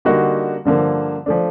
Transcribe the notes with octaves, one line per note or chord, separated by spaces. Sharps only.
D3 G3 A#3 D#4 F#4
G2 D3 F3 A#3
F3 A3 D4